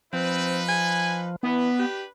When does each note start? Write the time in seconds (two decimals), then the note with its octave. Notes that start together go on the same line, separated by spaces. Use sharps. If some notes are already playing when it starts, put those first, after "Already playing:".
0.13 F3 C4 D#4 B4
0.69 G#5
1.43 E3 B3 D4 B4
1.79 G4